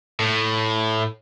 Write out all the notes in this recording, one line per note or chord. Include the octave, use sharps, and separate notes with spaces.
A2